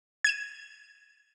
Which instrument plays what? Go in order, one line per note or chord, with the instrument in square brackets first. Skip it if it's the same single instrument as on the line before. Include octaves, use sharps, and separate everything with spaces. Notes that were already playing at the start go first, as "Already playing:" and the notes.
[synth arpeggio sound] G#6 D#7 E7